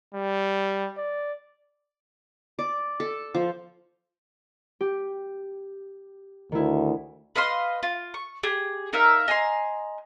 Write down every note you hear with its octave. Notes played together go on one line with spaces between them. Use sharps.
G3
D5
D5
A4
F3
G4
D2 D#3 E4
B4 D#5 F5 C6
F4
C#6
G4 G#4
D#4 A#4 E5 F5
D#5 G#5 A#5 C6